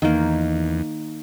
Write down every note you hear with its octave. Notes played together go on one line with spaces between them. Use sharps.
E2 D#3 A#3